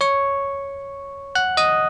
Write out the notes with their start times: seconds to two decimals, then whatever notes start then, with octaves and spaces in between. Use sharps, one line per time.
0.01 C#5 C#6
1.35 F#5 F#6
1.57 D#5 D#6